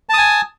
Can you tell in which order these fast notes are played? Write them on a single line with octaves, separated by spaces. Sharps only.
A5 D#6 G#5